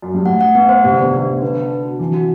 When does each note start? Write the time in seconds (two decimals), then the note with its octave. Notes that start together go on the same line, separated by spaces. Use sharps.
0.02 F#2
0.14 G2
0.26 A2 F#5
0.41 F#5
0.55 B3
0.69 C5
0.84 C3 B3
0.92 D3
0.99 C3 B3
1.08 D3
1.13 C3 B3
1.27 B3
1.42 D3 B4
1.56 A5
1.71 A5
1.85 F#4
1.99 E3 C4
2.14 F#4